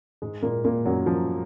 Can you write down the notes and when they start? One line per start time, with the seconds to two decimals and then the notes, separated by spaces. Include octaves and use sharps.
0.22 G#2 G#3
0.42 A#2 A#3
0.64 A#2 A#3
0.86 F#2 F#3
1.06 F3